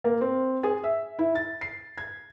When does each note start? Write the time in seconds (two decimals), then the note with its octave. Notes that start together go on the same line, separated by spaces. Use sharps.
0.04 A#3
0.21 C4
0.63 G#4
0.84 E5
1.19 E4
1.35 A6
1.61 C7
1.98 G#6